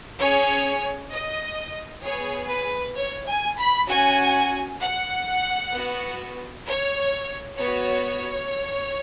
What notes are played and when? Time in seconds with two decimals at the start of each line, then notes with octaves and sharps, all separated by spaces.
0.19 C#4 G#4 C#5
1.12 D#5
2.04 B3 G#4 C#5
2.50 B4
2.97 C#5
3.27 G#5
3.58 B5
3.89 C#4 F#4 G#5
4.81 F#5
5.74 B3
5.79 F#4
6.67 C#5
7.59 B3 F#4 C#5